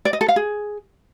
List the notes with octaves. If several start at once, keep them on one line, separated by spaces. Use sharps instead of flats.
D5
D#5
A4
F5
G#4